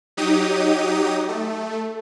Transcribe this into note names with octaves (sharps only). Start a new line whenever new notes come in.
F#3 D#4 G4 D#6
A3